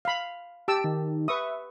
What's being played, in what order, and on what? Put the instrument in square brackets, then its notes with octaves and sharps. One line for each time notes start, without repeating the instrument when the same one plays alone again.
[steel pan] F5 B5
[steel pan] G4 A5 E6 [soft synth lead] D7
[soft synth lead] D#3
[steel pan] B4 C#6 D#6 [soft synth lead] E5